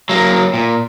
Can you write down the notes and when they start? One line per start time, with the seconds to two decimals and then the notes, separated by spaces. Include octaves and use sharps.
0.09 F#3 A#3
0.54 A#2